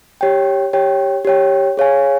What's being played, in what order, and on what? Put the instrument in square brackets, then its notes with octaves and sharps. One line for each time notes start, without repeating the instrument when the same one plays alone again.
[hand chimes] G4 C#5 G5
G4 C#5 G5
G4 C#5 G5
G#4 C#5 F5 G#5